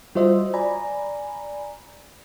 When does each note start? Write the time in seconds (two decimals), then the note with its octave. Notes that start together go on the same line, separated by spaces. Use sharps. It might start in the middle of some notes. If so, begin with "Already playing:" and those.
0.15 G3 F4 F#4 C5 D#5 E5
0.54 D5 G#5 A#5 B5